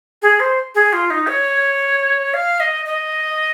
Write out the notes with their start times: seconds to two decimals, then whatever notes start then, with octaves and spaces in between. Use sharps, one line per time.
0.22 G#4
0.40 C5
0.75 G#4
0.93 F4
1.10 D#4
1.27 C#5
2.34 F5
2.60 D#5
2.86 D#5